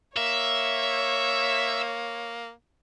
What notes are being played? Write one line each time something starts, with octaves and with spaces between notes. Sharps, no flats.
A#3 C#5 E5